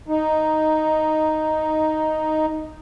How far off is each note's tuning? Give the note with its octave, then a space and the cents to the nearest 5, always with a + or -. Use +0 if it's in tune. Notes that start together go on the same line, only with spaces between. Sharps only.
D#4 +0